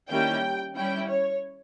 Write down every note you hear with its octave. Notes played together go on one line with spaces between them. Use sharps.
D#3 G3 A#3 C#4 E4 G5
G3 C#4 E4 G5
C#5